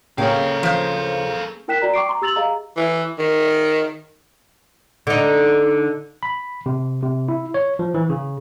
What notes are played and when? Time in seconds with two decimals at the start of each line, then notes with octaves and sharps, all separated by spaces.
0.18 C#3 A#3 C#4 G#4 A4 F5 G5
0.63 F3 C5
1.68 E4 A#4 G5 F#6 B6 E7
1.82 F#4 D5 A#5
1.94 G5 C#6 D6 C7 D7
2.09 A#5 C6
2.22 G4 E6 A6 F7 F#7
2.36 G#4 D#5 F5 A#5
2.77 E3
3.19 D#3
5.07 D3 D#4
6.23 B5
6.66 C3
7.02 C3
7.29 E4
7.54 C#5
7.79 F3
7.94 E3
8.10 C#3